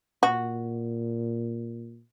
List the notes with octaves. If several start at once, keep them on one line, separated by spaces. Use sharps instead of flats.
A#2 F#4